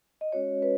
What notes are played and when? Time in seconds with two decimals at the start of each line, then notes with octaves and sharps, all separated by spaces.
0.21 D#5
0.32 G#3 C#4 F#4 C#5
0.62 B4